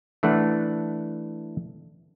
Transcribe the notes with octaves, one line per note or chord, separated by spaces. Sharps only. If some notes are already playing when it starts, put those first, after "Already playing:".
E3 A3 D4 F#5